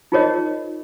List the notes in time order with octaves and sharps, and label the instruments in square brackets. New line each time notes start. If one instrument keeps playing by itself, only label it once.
[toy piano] D#4 F4 G#4 A#4 C#5 D#5